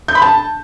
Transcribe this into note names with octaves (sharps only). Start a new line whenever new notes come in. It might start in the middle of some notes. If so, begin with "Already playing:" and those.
G6
B5
A5